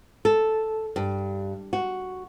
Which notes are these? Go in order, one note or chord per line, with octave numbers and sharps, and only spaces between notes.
A4
G2
F#4